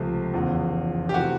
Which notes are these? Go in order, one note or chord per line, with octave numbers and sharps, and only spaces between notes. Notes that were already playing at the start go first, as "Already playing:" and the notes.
Already playing: C#2 C3 F3 A3
F1 E2 C#3
G4
C3 E3 A3 F#4